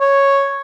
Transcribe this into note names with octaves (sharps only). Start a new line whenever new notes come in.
C#5